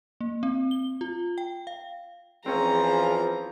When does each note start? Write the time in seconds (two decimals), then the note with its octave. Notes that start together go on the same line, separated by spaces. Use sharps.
0.21 A#3
0.43 C4
0.71 G7
1.01 F4
1.38 G5
1.67 F5
2.46 E2 E3 F3 C4 C#4 G#4 A#5